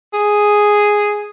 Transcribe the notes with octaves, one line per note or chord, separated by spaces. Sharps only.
G#4